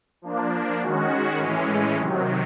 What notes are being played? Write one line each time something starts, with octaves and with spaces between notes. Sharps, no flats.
F3 A#3 D4
D#3 G#3 C#4 F#4
A2 E3 G#3 C#4
C3 D#3 F#3